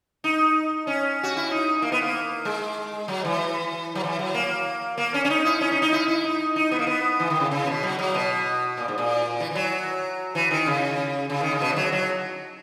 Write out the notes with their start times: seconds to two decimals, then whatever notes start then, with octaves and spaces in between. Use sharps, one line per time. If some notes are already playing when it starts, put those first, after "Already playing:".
0.24 D#4
0.87 C#4
1.23 F#4
1.37 E4
1.51 D#4
1.82 A#3
1.92 B3
2.01 A#3
2.45 G#3
3.08 F#3
3.25 E3
3.95 F#3
4.04 E3
4.19 F#3
4.34 A#3
4.97 A#3
5.14 C#4
5.25 C#4
5.30 D#4
5.45 E4
5.61 C#4
5.72 D#4
5.82 D#4
5.93 E4
6.08 E4
6.24 D#4
6.56 D#4
6.71 B3
6.79 A#3
6.87 B3
7.20 E3
7.30 D#3
7.40 C#3
7.51 C#3
7.67 B2
7.83 F#3
7.99 F#3
8.14 B2
8.77 A#2
8.88 G#2
8.98 A#2
9.40 E3
9.51 E3
9.55 F#3
10.35 E3
10.51 D#3
10.66 C#3
11.30 C#3
11.41 D#3
11.51 C#3
11.61 B2
11.73 E3
11.76 F#3
11.92 F#3